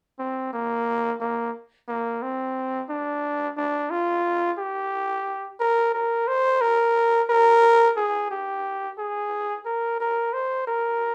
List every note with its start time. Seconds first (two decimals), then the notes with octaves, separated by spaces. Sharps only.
0.19 C4
0.53 A#3
1.20 A#3
1.88 A#3
2.22 C4
2.89 D4
3.57 D4
3.90 F4
4.58 G4
5.60 A#4
5.94 A#4
6.27 C5
6.61 A#4
7.30 A#4
7.97 G#4
8.31 G4
8.98 G#4
9.65 A#4
10.00 A#4
10.33 C5
10.67 A#4